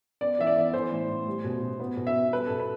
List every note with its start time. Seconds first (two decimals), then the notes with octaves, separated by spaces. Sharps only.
0.21 B3 D5
0.39 E3 E5
0.47 D5
0.56 B3
0.73 E3 C5
0.92 A2
1.09 A2
1.27 G3
1.44 B2
1.62 B2
1.80 B3
1.97 B2
2.07 E5
2.15 B3
2.33 G3 B4
2.46 B2 A4
2.60 B4